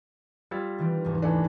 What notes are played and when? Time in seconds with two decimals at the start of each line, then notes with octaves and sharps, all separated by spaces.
0.51 G3 F4 E6 G#6 A6
0.78 D#3 E3 C4
1.05 F1 D#2 G#2
1.22 E3 A3 D4